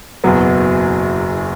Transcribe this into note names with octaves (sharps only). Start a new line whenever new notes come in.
F#1 E2 B2 F#3 B3